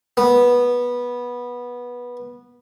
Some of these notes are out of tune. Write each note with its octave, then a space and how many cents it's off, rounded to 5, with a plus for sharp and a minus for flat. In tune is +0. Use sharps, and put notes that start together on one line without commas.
B3 -15